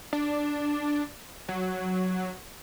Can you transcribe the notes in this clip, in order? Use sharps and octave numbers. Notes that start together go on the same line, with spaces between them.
D4
F#3